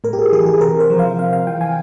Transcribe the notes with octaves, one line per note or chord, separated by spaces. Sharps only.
A2 A#4
G4
G#4
E3 G#4
G#4
C3 A#4
C5
F3
F5
C3 F5
F5
E3 G5
G#5